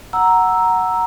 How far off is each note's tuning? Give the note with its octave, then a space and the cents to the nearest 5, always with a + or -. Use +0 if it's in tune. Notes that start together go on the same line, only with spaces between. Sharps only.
F#5 +0 A#5 +0 E6 +0